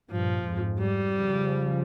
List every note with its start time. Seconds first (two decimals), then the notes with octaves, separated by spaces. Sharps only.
0.11 G2 A#2 F3
0.45 F2 G#2
0.79 G3
1.13 C#3 F3